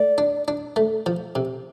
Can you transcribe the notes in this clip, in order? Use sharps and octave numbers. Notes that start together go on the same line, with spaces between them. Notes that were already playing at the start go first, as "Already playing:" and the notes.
Already playing: A3 D5
D4
D4
A3
F3
C3